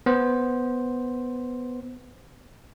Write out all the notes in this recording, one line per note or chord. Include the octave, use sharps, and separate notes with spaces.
B3 C5